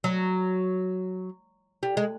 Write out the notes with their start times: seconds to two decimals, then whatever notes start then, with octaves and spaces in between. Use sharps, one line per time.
0.04 F#3
1.83 G3
1.97 G#3